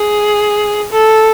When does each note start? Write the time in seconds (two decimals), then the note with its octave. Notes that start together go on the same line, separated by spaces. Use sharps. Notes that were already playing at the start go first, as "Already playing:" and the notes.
Already playing: G#4
0.92 A4